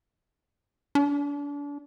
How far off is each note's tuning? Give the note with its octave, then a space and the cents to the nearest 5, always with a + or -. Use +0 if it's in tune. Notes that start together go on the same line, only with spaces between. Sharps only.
D4 -35